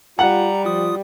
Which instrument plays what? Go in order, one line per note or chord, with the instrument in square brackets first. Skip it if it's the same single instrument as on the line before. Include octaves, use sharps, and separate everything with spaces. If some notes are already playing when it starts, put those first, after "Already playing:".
[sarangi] G3 [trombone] F4 [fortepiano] F#5 [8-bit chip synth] A#5
[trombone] F3 [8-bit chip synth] F4 D#6